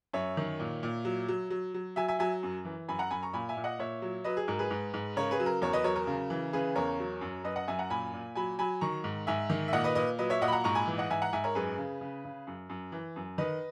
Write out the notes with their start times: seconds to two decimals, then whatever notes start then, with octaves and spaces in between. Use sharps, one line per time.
0.13 F#2 C#5 E5
0.37 D#3
0.60 A#2
0.83 A#2
1.05 F#3
1.28 F#3
1.50 F#3
1.74 F#3
1.96 F#3 E5 G#5
2.08 E5 G#5
2.19 F#3 E5 G#5
2.43 F#2
2.65 E3
2.88 F#2 G#5 B5
2.99 F#5 A#5
3.10 F#2 G#5 B5
3.23 A#5 C#6
3.33 A#2 G#5 B5
3.49 E5 G#5
3.57 A#2
3.64 D#5 F#5
3.79 A#2 C#5 E5
4.02 F#3
4.24 F#3 B4 D#5
4.37 G#4
4.48 G#2 A#4
4.59 G#4 B4
4.71 G#2
4.94 G#2
5.16 C#3 A#4 C#5
5.31 G#4 B4
5.40 F#3
5.46 A#4
5.62 E2 A#4 C#5
5.73 B4 D#5
5.84 F#3 A#4 C#5
5.96 A#4
6.07 C#3
6.30 E3
6.53 C#3 G#4 B4
6.76 E2 A#4 C#5
7.00 F#3
7.21 F#2
7.44 F#2 B4 D#5
7.56 D#5 F#5
7.68 F#2 E5 G#5
7.79 F#5 A#5
7.90 A#2 G#5 B5
8.14 A#2
8.35 F#3 G#5 B5
8.59 F#3 G#5 B5
8.81 D#3 A#5 C#6
9.04 G#2
9.27 G#2 E5 G#5
9.50 D#3
9.68 E5
9.73 A#2 D#5 F#5
9.84 B4 D#5
9.95 A#2 B4 D#5
10.19 F#3 B4 D#5
10.30 C#5 E5
10.42 A#2 D#5 F#5
10.48 B5
10.52 F#5 A#5
10.64 G#2 A#5 C#6
10.75 G#5 B5
10.87 E3
10.98 D#5 F#5
11.10 G#2 E5 G#5
11.22 F#5 A#5
11.33 G#2 E5 G#5
11.44 A#4 C#5
11.55 F#2 G#4 B4
11.78 C#3
12.01 C#3
12.25 C#3
12.47 F#2
12.70 F#2
12.92 E3
13.16 F#2
13.38 D#3 B4 D#5